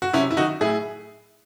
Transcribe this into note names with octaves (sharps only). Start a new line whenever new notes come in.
F#4
C3 C#4 E4
E4
D#3 D#4 F#4
A2 E4 G#4